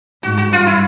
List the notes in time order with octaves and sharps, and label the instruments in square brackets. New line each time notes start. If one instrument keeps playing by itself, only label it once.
[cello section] G#2 [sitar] F#4
[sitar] F#4
[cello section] G2 [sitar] F4
[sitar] E4